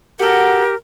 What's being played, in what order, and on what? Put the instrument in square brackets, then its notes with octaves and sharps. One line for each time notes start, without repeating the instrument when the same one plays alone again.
[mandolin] F#4 A4 [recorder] G4 [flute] A#4